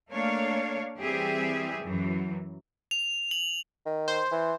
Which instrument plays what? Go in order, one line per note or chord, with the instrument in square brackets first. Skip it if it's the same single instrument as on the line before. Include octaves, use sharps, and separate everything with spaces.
[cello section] A3 A#3 D4 C#5 F5
E3 G3 C4 G4 G#4 E5
F#2 E3 F#3
[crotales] F7
F#7
[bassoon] D#3
[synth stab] C5
[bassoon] E3